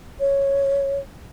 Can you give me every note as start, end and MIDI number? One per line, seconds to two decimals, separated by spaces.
0.20 0.99 73